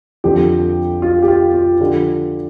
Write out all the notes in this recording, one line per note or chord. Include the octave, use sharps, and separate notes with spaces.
F2 D3 F3 G4
F4
G4
F4
F4
D3 F3 G4